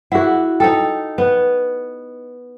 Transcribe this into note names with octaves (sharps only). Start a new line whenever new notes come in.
E4 F#4 G#4 F#5
D#4 A4 G5 D#6
B3